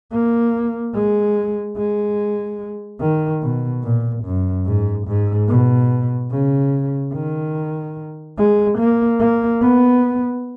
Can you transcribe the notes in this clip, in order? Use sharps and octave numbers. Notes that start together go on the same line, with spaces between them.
A#3
G#3
G#3
D#3
B2
A#2
F#2
G#2
G#2
B2
C#3
D#3
G#3
A#3
A#3
B3